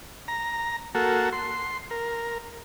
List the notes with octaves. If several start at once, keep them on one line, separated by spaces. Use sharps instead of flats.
A#5
A#3 F#4 A4
C6
A#4